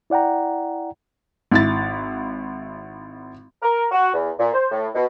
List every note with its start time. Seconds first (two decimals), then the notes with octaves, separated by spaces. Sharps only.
0.10 E4 D5 F#5 G5 A#5
1.51 G#1 E4 A6
3.62 A#4
3.91 F#4
4.14 E2
4.39 A#2
4.54 C5
4.71 A2
4.95 B2